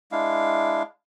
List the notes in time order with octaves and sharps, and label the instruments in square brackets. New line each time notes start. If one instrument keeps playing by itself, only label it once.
[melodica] G#3 D4 E4 F5